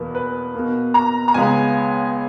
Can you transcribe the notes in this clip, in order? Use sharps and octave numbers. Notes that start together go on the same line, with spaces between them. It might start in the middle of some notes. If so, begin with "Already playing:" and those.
Already playing: E2 B2 A#3 B4
B4
B2 A#3
A#5
A#5
C#2 C#3 G#3 B3 G#5